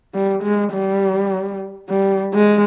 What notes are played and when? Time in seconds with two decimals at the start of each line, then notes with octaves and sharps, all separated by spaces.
0.14 G3
0.43 G#3
0.73 G3
1.89 G3
2.34 G#3